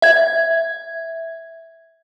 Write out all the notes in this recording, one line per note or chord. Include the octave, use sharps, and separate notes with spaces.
E5 G#6